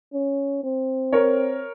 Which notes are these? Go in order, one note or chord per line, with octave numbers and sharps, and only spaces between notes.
C#4
C4
A#4 C#5